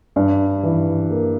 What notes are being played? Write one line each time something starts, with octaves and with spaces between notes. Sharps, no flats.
G2
E3
A#3